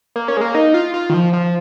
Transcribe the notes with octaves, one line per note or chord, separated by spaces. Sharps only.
A#3
C#4
G#3
A#3
D#4
F4
F4
D#3
F3
F3